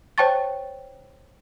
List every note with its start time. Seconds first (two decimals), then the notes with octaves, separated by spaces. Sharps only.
0.18 C5 C#5 G5 A5 C#6 A6